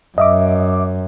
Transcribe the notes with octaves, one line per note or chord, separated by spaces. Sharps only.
F#2 D#5 E5 D6